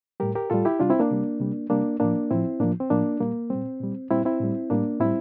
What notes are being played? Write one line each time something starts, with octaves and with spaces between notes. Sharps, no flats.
A2 G3 G4 A#4
G4 A#4
A2 G3 F4 A4
E4 G4
C3 G3 D4 F4
C4 E4
A#3 D4
C3 G3
C3 G3
C3 G3 A#3 D4
A2 F3 A#3 D4
A2 F3 C4 E4
A2 F3 A#3 D4
C4
A2 F3 A#3 D4
A#2 G3 A#3
A#2 G3 C4
A#2 G3
A#2 G3 C4 E4
C4 E4
A2 G3
A2 G3 A#3 D4
A2 G3 C4 E4